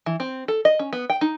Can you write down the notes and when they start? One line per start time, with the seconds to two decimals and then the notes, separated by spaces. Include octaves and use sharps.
0.06 E3
0.20 C4
0.48 A4
0.65 D#5
0.79 C#4
0.93 B3
1.10 G5
1.21 D#4